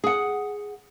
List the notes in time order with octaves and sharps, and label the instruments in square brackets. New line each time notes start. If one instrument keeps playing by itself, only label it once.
[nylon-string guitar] G#4 F#5